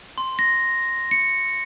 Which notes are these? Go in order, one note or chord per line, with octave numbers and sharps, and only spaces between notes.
C6
A#6
C#7